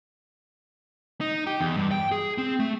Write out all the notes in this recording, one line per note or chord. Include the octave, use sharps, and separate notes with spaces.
D#4
G4
E2
G2
G5
G#4
C4
A3